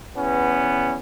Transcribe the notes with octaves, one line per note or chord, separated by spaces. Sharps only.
E2 B3 C#4